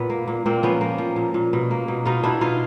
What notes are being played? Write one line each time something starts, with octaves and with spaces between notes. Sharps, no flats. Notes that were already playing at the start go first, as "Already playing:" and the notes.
Already playing: A#2 B3
A#3
A#2
A#2 A#3 C4
F3 B3 C#4
A#3
F3
A#2
A#2
B2
A#3
B2
B2 D#4 F4
B2 D4 E4
B2 D#4 F4